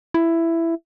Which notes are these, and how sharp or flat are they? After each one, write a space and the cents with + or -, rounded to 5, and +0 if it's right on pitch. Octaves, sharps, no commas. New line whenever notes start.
E4 +10